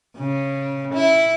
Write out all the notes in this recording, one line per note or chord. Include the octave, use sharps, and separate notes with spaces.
C#3
E4